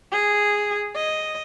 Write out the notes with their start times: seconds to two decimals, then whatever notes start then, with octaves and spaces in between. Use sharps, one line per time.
0.12 G#4
0.96 D#5